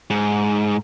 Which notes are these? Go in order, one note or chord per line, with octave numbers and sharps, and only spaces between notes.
G#2